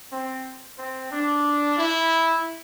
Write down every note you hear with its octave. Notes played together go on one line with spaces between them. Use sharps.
C4
C4
D4
E4